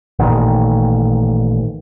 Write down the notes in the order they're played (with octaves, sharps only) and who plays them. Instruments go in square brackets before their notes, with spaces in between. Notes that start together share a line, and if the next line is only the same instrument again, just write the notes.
[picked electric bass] A1 A#2 D#3